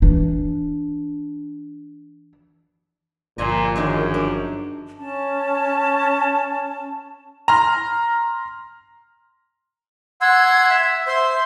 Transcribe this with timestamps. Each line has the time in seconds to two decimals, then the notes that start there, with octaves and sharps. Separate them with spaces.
0.02 E3 D4
3.38 G1 A#2 F3 D#5 G#5 A#5
3.76 F#2 D#3 G#3 D4
4.14 D4
4.97 C#4 A5
7.48 A#5 C6 F6
10.21 F#5 C6 E6 G#6
10.70 E5
11.07 C5 E5 C6